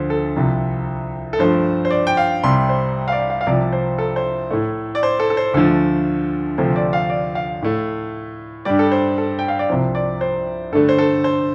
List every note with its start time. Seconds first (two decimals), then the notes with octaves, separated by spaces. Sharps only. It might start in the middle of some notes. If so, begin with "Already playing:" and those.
Already playing: D2 D3 F3 C5
0.10 A4
0.36 C2 C3 F3
1.33 A4
1.39 G2 F3 A3 C5
1.85 C5
1.91 D5
2.07 G5
2.17 F5
2.43 C2 C3 G3 C6
2.69 C5
3.08 F5
3.12 D5
3.30 F5
3.41 F5
3.46 C2 C3 F3 D5
3.73 C5
3.98 A4
4.16 C5
4.51 A2 A3
4.95 D5
5.03 C5
5.20 A4
5.30 A4
5.37 C5
5.54 D2 D3 F3 A3 A4
6.58 D2 C3 F3 A3 C5
6.76 D5
6.93 F5
7.10 D5
7.35 F5
7.62 A2 A3
8.65 G2 G3 D5
8.79 A4
8.92 C5
9.18 A4
9.39 G5
9.48 F5
9.59 D5
9.69 C2 C3 F3 C5
9.95 D5
10.21 C5
10.72 G2 D3 A3 A4
10.89 C5
10.98 A4
11.24 C5